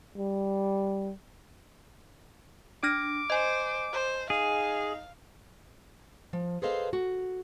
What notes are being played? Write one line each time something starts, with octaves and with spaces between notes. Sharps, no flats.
G3
D4 D6 F6 A#6
C5 D#5 G#5
C5
D#4 G#4 F5
F3
G#4 A4 B4 C5 D#5 F5
F#4